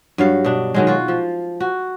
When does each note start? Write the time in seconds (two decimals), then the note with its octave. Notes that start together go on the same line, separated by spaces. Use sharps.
0.18 G2 F#3 F5
0.44 B2 D4
0.74 D#3 F#3 G#3
0.87 F4 F#4
1.08 F3
1.60 F#4